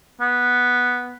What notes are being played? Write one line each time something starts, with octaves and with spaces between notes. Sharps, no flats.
B3